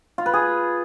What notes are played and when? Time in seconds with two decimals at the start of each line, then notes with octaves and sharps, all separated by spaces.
0.18 F4
0.26 B4
0.34 G#4